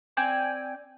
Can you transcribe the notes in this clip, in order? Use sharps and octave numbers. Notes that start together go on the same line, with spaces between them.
C4 D5 G5 G#5